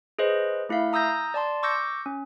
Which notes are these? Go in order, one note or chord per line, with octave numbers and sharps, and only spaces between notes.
G#4 B4 C5 D#5
A3 E4 E5 F5
A#5 D#6 E6 G6 A#6
D5 A5 C6
C#6 D6 E6 G6 A#6 C#7
C#4